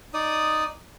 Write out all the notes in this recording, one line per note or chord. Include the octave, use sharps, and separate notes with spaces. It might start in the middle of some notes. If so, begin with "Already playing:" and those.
D#4 D5 D#6